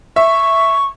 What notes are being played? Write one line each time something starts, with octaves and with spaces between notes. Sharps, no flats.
E5 C#6